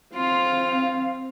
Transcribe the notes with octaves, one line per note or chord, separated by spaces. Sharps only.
C4 F4 F5